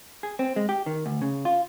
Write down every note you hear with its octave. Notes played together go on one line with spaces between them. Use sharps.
G#4
C4
G#3
G4
D#3
D2
C#3
F4